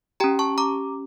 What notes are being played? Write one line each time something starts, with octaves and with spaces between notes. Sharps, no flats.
C#4 G4 G5 A#5
A5 C#6
A#5 D6